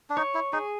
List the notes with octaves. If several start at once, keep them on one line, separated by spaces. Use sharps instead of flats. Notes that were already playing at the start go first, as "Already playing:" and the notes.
D4
D#4 C#5
E4
D#4 G#4